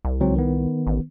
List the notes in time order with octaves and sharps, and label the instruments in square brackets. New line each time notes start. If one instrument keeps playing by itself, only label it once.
[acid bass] C2
[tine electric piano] C#2 F#3 C4
D#3 B3
[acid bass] A1